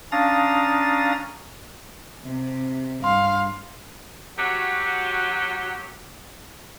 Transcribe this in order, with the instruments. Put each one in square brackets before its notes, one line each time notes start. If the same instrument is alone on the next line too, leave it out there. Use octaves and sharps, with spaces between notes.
[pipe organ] C#4 D4 F5 A#5 D#6 A6
[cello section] C3
[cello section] G2 [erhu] F5 [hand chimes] C6
[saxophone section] F#3 F#4 G4